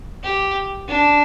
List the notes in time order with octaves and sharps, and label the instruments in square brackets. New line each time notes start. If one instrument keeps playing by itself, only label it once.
[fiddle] G4
D4